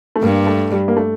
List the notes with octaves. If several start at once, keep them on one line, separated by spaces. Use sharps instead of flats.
A3
G2 A#3
A3
G3
A#3
A3